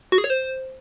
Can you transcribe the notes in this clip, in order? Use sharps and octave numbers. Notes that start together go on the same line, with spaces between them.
F#4
G#4
C#5
C5